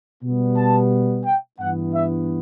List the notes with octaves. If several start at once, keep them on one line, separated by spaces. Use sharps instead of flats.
B2 G3 B3
A5
G5
G2 E3 B3 F#5
E5